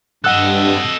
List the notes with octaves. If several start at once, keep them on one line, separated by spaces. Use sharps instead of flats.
G2 A4 D#5 F#5 E6 F#6